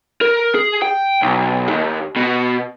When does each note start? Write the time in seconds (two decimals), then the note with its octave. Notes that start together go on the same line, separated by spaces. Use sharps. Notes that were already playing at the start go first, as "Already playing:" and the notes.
0.21 A#4
0.55 G#4
0.82 G5
1.22 B1
1.70 D#2
2.16 B2